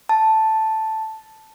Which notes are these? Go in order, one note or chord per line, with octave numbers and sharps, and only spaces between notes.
A5